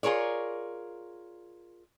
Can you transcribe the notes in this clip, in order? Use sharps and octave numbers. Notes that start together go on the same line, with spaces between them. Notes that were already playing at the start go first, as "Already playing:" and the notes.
F4 G#4 A#4 C#5 D5